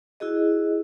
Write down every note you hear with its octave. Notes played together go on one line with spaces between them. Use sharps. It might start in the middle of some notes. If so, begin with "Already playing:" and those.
E4 F#4 G#4 D#5